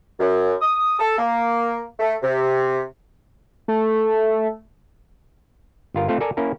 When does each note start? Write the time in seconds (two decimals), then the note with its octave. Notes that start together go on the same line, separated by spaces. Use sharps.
0.20 F#2
0.61 D#6
0.99 A4
1.18 A#3
2.00 A3
2.22 C3
3.68 A3
5.94 G1 F4 A#4
6.08 A3 C4 F4 A4 F5
6.20 A4 A#4 D5 G#5 A#5
6.37 A#3 C#4 E4 A#4